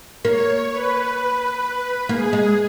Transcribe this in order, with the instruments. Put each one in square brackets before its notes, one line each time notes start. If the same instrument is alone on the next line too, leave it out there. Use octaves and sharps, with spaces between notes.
[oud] A#3 [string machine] C#5
[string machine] B4
[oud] A#3 [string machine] G#4
[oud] G#3